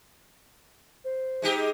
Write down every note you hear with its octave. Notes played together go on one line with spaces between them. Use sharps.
C5
G#3 D#4 G4